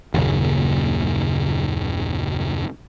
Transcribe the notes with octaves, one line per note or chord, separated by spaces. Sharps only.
F#1 D#2 A#2 C#3